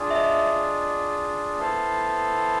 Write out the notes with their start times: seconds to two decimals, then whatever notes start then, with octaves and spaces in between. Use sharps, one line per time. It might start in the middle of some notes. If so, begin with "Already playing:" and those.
Already playing: D4 F4 G#4
0.11 E5
0.15 D#5
1.58 B3 E4 A4 C5 F5